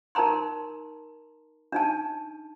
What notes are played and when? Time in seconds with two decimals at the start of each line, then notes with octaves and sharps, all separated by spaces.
0.15 D#4 A#4 A5 A#5 C6
1.72 D4 D#4 A5